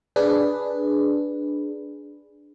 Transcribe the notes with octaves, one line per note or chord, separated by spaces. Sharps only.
D4 G#4 B4